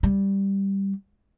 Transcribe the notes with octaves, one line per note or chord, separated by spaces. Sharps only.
G3